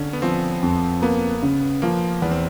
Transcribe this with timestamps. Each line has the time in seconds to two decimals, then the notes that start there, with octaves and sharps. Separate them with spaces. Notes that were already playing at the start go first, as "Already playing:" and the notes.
Already playing: D3 C#4
0.13 B3
0.22 F3 C4
0.63 F2
1.02 A#3 B3
1.43 C#3
1.82 F3 A#3
2.22 E2 B3
2.31 C4